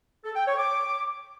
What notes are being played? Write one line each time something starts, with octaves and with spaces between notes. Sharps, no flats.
A4
G5
C#5
D6